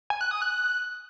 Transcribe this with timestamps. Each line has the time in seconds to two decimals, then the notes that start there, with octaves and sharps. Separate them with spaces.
0.10 G#5
0.21 F#6
0.31 D#6
0.42 F#6